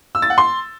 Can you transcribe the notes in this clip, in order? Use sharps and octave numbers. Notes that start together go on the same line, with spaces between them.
E6
A6
F#5
C6